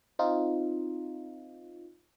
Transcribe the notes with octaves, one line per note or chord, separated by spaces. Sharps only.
C4 D#4 F4